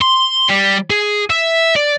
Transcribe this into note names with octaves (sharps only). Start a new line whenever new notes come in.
C6
G3
G#4
E5
D5